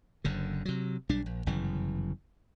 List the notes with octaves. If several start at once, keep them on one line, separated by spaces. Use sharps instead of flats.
F#1 F#2 D3
C3 F#3
B1 G3 D4
A#1
G1 F#2 C#3 E3